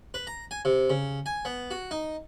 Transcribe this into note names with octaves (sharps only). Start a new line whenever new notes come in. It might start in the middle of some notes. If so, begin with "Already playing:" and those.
B4
A#5
G#5
C3
C#3
G#5
B3
F#4
D#4